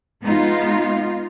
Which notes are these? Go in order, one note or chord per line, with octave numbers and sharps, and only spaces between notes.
G#3 B3 D#4 F4